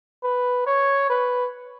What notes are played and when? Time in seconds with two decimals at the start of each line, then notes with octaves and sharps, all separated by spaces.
0.23 B4
0.67 C#5
1.10 B4